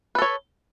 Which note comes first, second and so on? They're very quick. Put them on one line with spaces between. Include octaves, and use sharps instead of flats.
B4 A4 C#5